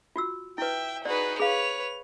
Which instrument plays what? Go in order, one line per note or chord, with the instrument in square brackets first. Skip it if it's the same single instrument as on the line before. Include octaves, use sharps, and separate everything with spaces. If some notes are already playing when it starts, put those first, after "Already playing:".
[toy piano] F4 F#4 E6
[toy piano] E4 B4 [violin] E5 G5
[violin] D#4 F#4 [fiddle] G#4 B4 [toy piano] D5
[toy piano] G#4 F5 [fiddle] B4 C#5 [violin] F7